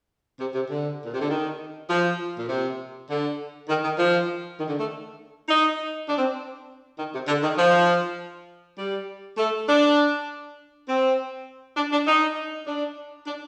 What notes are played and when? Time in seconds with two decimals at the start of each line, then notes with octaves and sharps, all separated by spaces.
0.40 C3
0.54 C3
0.70 D3
1.05 A#2
1.13 C3
1.21 D3
1.30 D#3
1.90 F3
2.38 A#2
2.49 C3
3.10 D3
3.69 D#3
3.83 D#3
3.98 F3
4.58 D#3
4.68 D3
4.79 A3
5.49 D#4
6.09 D4
6.18 C4
6.98 D#3
7.14 C3
7.27 D3
7.43 D#3
7.58 F3
8.77 G3
9.37 A3
9.68 D4
10.87 C4
11.76 D4
11.92 D4
12.07 D#4
12.66 D4
13.27 D4